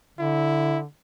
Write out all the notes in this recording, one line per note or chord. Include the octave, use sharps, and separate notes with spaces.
D3 E4